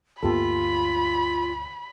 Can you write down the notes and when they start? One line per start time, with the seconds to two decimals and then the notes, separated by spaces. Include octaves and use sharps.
0.23 D2 G2 A#3 B3 F4 G4 A4 B5